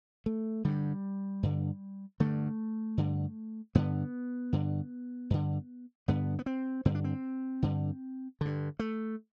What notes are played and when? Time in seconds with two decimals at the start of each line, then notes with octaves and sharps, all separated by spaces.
0.26 A3
0.65 G2 D3 G3
1.43 G2 D3
2.20 G2 D3 A3
2.97 G2 D3
3.75 G2 D3 B3
4.53 G2 D3
5.30 G2 D3
6.08 G2 D3 B3
6.39 B3
6.46 C4
6.85 G2 D3 C4
6.95 D4
7.04 C4
7.62 G2 D3
8.41 G2 D3
8.79 A3